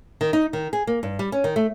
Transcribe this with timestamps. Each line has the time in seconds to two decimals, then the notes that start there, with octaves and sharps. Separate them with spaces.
0.21 D#3
0.33 D#4
0.53 D#3
0.73 G#4
0.87 A#3
1.03 G2
1.19 G3
1.32 C#4
1.44 D#3
1.56 A3